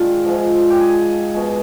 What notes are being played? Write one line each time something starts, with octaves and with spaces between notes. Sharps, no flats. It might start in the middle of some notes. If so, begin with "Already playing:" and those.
Already playing: D#3 G#3 D4 F4
G#2 F3 G#3
G4
G#4
B2 G#3